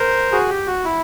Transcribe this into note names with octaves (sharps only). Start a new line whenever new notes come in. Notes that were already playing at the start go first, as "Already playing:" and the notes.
Already playing: A#4 C5
F#4 G#4
G4
F#4
E4